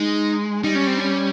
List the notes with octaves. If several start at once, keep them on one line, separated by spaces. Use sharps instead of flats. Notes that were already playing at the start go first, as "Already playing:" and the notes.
Already playing: G#3 D#4
G3 D#4
C#4
C4
C#4